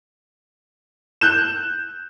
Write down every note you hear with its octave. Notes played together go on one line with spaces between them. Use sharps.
F#6 G6 E7